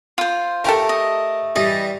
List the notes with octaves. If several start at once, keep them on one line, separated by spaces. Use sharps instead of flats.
F4 C5
A3 G4 A4 A#4
D#5
E3 G3 D#5